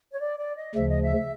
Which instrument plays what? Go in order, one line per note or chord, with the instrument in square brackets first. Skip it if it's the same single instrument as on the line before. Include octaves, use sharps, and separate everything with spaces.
[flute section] C#5
D5
D5
D#5
[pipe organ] D2 C#3 F3 [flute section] E5
[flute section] D#5
E5